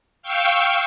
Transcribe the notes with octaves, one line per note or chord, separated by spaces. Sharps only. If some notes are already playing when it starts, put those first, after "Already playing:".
F5 G5 C#6 E6